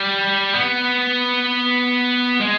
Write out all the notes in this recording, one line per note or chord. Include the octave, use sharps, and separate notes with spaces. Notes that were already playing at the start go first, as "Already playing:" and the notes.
Already playing: G3
B3
G#3